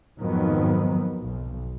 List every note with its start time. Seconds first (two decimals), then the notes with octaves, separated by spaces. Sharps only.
0.20 F2 G#2 D#3 F#3 B3
1.23 B1